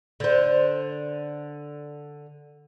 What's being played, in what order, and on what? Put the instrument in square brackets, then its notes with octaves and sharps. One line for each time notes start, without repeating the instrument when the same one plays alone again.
[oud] D3 C5